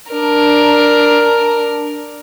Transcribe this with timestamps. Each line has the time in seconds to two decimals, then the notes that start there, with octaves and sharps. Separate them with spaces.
0.12 D4 A#4